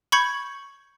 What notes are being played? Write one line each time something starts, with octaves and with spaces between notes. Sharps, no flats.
B5 C#6 G6 G#6 C#7 F#7